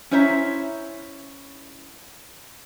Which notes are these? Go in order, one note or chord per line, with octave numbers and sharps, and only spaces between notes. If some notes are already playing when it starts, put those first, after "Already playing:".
C#4 E4 C5 C#5 E5 A#5